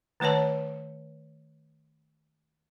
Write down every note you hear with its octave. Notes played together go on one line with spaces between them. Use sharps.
D#3 A3 B4 C#5 A5